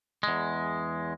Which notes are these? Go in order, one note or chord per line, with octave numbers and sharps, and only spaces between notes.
E2 G#3